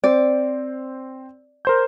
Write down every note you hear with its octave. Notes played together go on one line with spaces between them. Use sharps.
C4 C5 D5
A#4 C5 G6